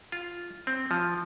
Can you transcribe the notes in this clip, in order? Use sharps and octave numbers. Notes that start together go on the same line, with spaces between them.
F4
C4
F3